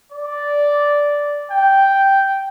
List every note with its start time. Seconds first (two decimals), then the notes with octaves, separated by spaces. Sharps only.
0.12 D5
1.52 G5